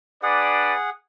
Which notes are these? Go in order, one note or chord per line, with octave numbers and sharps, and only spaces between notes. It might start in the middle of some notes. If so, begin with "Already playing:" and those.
D4 G#4 B4 D5 F#5